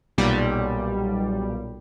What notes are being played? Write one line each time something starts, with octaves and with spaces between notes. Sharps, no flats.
B1 A#2 G3